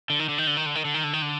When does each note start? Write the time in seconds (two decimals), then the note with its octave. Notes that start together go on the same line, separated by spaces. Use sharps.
0.10 D3
0.19 D#3
0.29 D3
0.38 D#3
0.47 D3
0.57 D#3
0.66 D3
0.75 D#3
0.85 D3
0.94 D#3
1.04 D3
1.13 D#3
1.22 D3